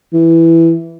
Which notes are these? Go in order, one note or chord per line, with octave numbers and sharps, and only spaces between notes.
E3